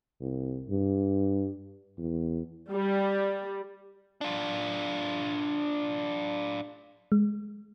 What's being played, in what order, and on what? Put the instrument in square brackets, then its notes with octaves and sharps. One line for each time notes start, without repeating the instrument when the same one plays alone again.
[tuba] C2
G2
E2
[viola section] G3
[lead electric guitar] D4 F4
[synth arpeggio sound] G#3